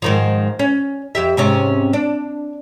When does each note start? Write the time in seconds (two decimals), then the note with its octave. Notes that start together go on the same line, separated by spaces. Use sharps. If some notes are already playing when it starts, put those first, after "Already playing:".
0.02 G#2 D#3 F3
0.59 C#4
1.15 F2 G4 E5
1.37 G#2 C3 C#4
1.93 D4